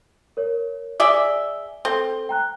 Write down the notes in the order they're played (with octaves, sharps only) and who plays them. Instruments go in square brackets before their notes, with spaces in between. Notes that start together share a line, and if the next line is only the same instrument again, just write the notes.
[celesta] A#4 C#5
[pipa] G#4 D5 E5 [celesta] G7
[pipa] C4 [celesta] A4 G7
[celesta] G5 A#5 F#6